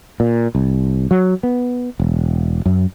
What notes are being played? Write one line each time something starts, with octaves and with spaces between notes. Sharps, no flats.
A#2
C2
F#3
B3
E1
F#2